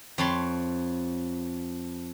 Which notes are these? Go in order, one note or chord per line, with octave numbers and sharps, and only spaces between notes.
F2 C#5 A5 B5 C6